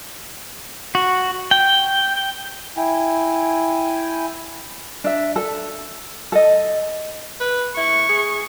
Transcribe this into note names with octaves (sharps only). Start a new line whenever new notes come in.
F#4
G5
E4 G5 G#5
D4 E5
A4
A4 D#5
B4
E4 C#6
G#4